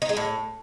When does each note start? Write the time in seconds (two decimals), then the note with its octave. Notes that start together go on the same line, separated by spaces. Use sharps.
0.02 D#4
0.09 G#3
0.17 A2